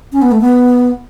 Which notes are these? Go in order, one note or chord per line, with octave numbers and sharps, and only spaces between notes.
C#4
B3
A3
B3